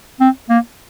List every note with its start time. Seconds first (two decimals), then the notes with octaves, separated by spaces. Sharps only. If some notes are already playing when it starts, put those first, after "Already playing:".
0.20 C4
0.50 A#3